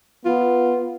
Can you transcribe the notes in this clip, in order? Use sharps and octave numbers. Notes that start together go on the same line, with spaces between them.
B3 F4